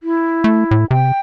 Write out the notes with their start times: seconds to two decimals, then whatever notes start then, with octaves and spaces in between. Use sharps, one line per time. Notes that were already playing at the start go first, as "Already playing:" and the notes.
0.03 E4
0.44 A3
0.71 A2
0.91 C3 G5